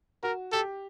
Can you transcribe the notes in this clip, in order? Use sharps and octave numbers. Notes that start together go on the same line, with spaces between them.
F#4 A#4
G4 A4